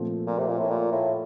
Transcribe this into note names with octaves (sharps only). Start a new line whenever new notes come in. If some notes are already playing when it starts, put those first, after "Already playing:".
Already playing: A#2 F3 A3 C4
A#2
C3
A#2
A2
A#2
A2